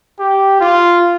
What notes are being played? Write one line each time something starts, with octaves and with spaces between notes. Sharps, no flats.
G4
F4